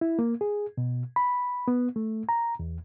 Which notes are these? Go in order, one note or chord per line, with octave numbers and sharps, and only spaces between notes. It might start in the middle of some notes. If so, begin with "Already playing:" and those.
E4
A#3
G#4
B2
B5
B3
A3
A#5
E2